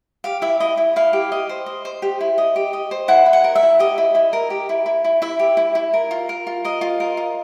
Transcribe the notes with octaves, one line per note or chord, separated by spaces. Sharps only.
G4 F5
E4 E5
E4 D#5
E4
E4 F5
G4
D#5
C5
D#5
C5
G4
E4
D#5
G4
D#5
C5
E4 F#5
E4
F#5
A#4
E5
E4
G4 D#5
E4
E4
A#4
G4
E4
E4
E4
E4 E5
G4
E4
E4
A#4
F4
A#4
F4
A#4 D#5
F4
A#4
F4